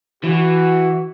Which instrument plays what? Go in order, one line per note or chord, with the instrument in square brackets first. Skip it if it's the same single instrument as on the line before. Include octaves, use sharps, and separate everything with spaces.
[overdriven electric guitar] E3 [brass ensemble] F#4